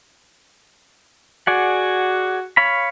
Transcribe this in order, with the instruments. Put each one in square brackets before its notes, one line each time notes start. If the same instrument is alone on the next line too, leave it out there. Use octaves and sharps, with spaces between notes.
[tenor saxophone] F#4 [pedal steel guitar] G#4 D5 F#5
[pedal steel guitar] C#5 F5 B5